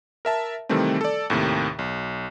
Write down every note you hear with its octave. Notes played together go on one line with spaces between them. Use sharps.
A#4 E5 A5
C3 D#3 E3 G3 A3 C4
A4 D5
D#2 A2 C3 D#3
B1